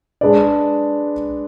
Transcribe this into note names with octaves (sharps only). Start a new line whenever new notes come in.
G#3 D4 G#4 B4 D5